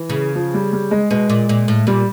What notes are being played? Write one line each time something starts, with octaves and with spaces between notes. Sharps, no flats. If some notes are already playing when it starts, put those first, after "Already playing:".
Already playing: E3
C#3
F3
G3
G3
G#3
B2 G#3
A#2
A#2
A2
A#2 G3